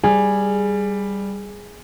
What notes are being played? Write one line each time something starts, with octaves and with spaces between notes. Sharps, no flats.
G3 G#4